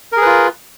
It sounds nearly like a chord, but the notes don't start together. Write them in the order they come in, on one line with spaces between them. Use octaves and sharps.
A#4 G#4 B4 F4